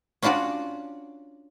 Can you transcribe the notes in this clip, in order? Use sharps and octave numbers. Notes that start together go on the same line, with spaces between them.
C#4 D4 F4 F#4 D5